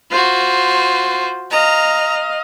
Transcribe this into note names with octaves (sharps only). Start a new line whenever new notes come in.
F4 F#4 C5
D#5 F5 A#5